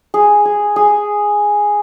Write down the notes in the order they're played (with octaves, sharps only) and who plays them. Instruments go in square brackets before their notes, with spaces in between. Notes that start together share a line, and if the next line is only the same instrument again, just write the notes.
[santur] G#4
G#4
G#4